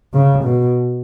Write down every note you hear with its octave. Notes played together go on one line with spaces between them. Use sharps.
C#3
B2